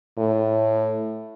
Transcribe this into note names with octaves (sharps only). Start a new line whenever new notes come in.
A2